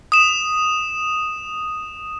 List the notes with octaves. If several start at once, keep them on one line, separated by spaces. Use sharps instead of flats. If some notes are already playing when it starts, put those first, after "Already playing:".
D#6 E7